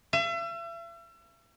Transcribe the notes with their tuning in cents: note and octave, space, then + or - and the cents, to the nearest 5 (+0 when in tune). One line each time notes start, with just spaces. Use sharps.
E5 +40